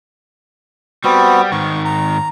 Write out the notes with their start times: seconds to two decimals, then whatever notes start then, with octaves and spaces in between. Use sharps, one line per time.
1.04 G3 B3 C4 F#4
1.52 G#2 D#3 C#6
1.85 A#5